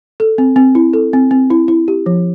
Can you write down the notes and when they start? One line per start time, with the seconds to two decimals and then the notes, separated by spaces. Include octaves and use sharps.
0.20 A4
0.38 C4
0.56 C4
0.75 E4
0.93 A4
1.13 C4
1.31 C4
1.50 E4
1.68 E4
1.88 G4
2.06 F3